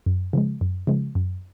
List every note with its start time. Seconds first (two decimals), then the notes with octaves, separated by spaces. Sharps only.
0.06 F#2
0.33 C#3 F3 G#3
0.61 F#2
0.87 C#3 F3 G#3
1.15 F#2